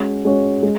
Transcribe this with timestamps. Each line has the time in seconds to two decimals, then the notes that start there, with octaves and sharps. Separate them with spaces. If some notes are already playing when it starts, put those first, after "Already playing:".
Already playing: G#3 C#4 F#4 C#5
0.25 G#3 C#4 F#4 C#5
0.63 G#3